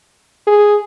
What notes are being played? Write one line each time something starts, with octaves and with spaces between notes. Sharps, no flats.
G#4